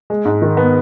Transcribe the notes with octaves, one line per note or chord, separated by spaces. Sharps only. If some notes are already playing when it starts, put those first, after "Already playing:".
G#3
G#2
D#3
B3